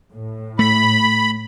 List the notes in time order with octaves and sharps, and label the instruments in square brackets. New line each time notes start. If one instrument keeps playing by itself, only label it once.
[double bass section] A2
[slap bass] A3 [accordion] B5